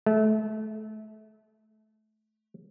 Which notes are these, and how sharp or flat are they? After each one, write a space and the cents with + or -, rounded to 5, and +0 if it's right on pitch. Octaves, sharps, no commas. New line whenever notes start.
A3 -30